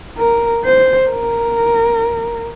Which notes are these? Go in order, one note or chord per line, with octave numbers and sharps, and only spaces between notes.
A#4
C5
A#4